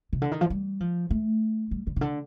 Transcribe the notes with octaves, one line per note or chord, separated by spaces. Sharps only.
C3
D3
D#3
F3
G3
F3
A3
G3
D3
C3
D3